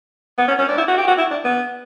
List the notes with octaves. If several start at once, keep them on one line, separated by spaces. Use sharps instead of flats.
B3
C#4
C#4
D4
E4
F#4
G4
F#4
E4
D4
B3